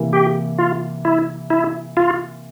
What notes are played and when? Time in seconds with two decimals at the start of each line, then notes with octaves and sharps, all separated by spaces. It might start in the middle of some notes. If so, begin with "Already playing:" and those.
Already playing: C3 E3 A#3
0.13 G4
0.58 F4
1.05 E4
1.50 E4
1.97 F4